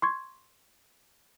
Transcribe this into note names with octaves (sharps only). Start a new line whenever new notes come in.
C6 C#6 G#6